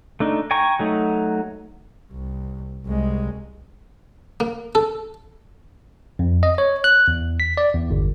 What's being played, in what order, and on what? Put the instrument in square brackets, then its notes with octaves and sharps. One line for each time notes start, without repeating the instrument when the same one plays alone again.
[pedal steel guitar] A3 D4 D#4
G5 G#5 A#5 C#6
F#3 A3 D#4
[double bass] C2
C2 G#3
[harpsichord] A#3
A4
[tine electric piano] F2
D#5
C#5
F#6
E2
B6
D5
E2
G1